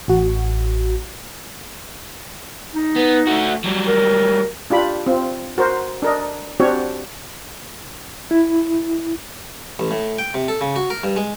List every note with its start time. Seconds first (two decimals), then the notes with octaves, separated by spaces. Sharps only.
0.08 A1 F#4
2.73 D#4
2.96 B3
3.27 A3 F#4
3.64 F#3 G3
3.87 A#4
4.70 D4 F4 G4 B5
5.06 C4 F4
5.58 F#4 A#4 C5
6.02 D4 A#4 D#5
6.60 C4 D4 F#4 G4 C#5
8.31 E4
9.79 A1
9.91 A2
10.18 G5
10.34 C3
10.48 A4
10.61 C#3
10.76 F#4
10.90 A#4
11.03 G2
11.16 G#3